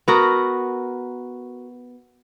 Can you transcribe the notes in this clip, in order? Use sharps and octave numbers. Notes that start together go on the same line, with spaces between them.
B3 F#4 A#4